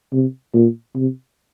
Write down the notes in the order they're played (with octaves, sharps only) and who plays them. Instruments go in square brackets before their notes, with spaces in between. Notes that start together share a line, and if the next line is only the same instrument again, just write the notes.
[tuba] C3
A#2
C3